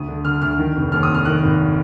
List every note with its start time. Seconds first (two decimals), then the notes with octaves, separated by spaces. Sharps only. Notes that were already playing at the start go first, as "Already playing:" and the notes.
Already playing: D2 D#6
0.08 D3
0.25 D3 F6
0.41 D2 F6
0.58 D#3
0.75 F1
0.92 D#2 F6
1.03 D#6
1.09 F1
1.14 F6
1.25 D#3 F#6
1.43 G#1